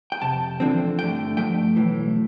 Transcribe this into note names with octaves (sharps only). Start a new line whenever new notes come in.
G5
F2 C3 A5
E2 D3 F3 C4
G2 D3 A3 G5
G2 F3 A3 G5
B1 A2 E3